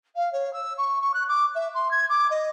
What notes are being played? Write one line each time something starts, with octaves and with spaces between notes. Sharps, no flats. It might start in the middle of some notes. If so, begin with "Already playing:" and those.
F5
C#5
E6
C#6
C#6
F#6
D6
E5
C6
G#6
D6
D#5